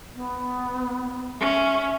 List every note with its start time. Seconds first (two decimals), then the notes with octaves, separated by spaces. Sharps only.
0.15 B3
1.40 C#4 E5